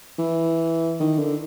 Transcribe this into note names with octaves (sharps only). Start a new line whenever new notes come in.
E3
D#3
D3